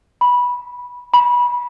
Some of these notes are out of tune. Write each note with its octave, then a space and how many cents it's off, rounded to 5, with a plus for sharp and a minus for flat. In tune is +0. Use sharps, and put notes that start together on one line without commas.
B5 -15
B5 -25